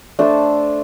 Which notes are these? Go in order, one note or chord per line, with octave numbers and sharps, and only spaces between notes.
A3 D4 A4 C5